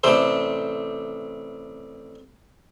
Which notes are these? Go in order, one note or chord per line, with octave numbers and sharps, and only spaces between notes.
A1 C3 G3 A4 C5